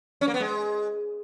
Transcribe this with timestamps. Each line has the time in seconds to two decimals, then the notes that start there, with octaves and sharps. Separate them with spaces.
0.21 C#4
0.28 A#3
0.34 B3
0.40 G#3